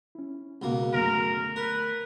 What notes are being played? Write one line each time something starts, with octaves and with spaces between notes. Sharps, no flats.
C#4 E4
C#2 B2 A#3
F#2 D3 A3 A#4
A#4 B4